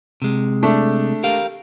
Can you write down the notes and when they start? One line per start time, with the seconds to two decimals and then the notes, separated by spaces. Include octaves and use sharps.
0.22 C3 G#3
0.63 A3 D4
1.23 G4 A#4 F5